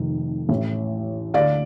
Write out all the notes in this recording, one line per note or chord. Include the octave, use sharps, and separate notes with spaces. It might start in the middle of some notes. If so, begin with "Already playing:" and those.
Already playing: F1 F2 D#3
A1 A2
D2 D3 D5 F5